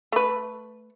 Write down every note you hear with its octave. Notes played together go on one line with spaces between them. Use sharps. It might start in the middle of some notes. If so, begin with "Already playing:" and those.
A3 B4